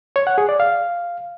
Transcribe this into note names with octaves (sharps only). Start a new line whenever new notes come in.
C#5
F#5
G#4
D5
F5